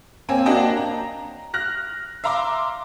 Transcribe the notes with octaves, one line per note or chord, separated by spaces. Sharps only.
A#3 C4 C#4 G#5
A#3 D4 F#4 D#5 G5 A5
A#5
F6 F#6 A#6
E5 F5 A#5 C6 D6